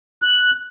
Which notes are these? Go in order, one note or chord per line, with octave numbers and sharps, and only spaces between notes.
F#6